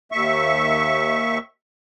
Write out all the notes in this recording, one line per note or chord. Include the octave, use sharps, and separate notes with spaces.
D#2 E5 C#6